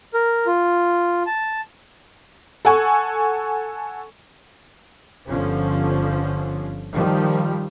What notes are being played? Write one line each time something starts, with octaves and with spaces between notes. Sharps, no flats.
A#4
F4
A5
A4 F#5 G#5 C#6
G1 D3 F3 C#4
D#3 F3 G3